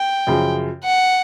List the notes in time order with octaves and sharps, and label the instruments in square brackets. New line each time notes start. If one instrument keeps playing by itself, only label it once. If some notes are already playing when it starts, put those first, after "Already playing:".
Already playing: [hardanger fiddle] G5
[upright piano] F#2 C#3 F3
[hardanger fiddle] F#5